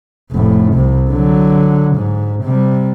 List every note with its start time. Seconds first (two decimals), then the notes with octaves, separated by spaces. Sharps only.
0.32 F1 A2
0.74 C2 C3
1.11 D3 F#3
1.96 G#2
2.44 C3 G3